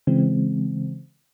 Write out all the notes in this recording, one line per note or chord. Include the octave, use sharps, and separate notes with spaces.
C#3 E3 G#3 C4